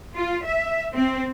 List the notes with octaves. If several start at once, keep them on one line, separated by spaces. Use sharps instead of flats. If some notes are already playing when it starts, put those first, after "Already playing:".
F4
E5
C4